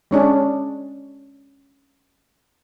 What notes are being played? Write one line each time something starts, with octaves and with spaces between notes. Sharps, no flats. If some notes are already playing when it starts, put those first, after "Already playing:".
G#3 C#4 D4 G#4